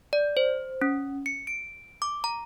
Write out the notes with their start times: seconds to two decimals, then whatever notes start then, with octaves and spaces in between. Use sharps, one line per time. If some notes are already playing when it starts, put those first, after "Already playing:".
0.13 D5
0.37 C5
0.81 C#4
1.26 C#7
1.47 D7
2.02 D6
2.24 A#5